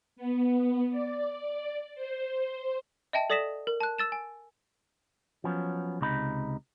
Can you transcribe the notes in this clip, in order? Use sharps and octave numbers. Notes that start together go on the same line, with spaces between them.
B3
D5
C5
D#5 E5 G5 A5
A4 D5 D#6 A#6 B6 E7
A#4
A5 F#6
E6 A6 E7
G#5
F3 F#3 B3 C#4
C#2 C3 D#4 B5